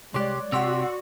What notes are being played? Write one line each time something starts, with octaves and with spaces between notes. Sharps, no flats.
C2 G#3 G4 C#5 D5 C6 D6 F#6
C3 F#4 G4 F#5 C6 E6